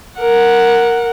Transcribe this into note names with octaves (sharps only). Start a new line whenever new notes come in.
A#4 F#5